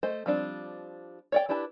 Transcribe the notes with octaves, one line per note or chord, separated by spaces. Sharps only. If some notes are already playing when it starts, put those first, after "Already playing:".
A3 C5 D#5
F3 G3 C4 D4
C#5 D5 G5
D4 E4 G4 B4 A5